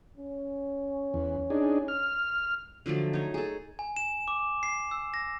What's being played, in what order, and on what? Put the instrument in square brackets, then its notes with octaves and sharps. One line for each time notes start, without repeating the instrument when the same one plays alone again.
[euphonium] C#4
[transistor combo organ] E2
D4 D#4 G#4
F6
[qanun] D3 F3 F#3 A3
D#4 C#5
G#4 A4
[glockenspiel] G#5
E7
D6
C7
E6
A#6